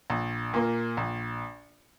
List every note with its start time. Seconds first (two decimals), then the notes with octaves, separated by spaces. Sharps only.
0.10 A#1
0.54 A#2 A#3
0.97 A#1